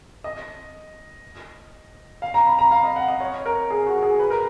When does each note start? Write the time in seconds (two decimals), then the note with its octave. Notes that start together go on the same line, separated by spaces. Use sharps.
0.24 D#5
2.22 F5
2.34 A#5
2.46 B5
2.59 A#5
2.71 F5
2.84 D#5
2.96 F#5
3.08 D#5
3.20 C#5
3.46 A#4
3.70 G#4
3.86 F#4
4.03 G#4
4.20 B4
4.30 A#4